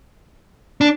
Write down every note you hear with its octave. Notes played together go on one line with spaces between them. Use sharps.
D4